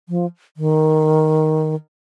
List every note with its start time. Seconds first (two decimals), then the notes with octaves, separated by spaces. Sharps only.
0.09 F3
0.57 D#3